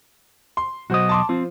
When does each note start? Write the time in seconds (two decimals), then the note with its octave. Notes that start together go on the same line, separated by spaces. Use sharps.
0.57 C6
0.90 B1 F#3 F#4 C5 D#5
1.09 A5 C6 D6
1.29 F3 C4